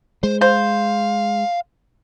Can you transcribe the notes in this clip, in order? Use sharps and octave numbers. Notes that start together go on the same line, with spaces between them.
G#3 C5
C5 F5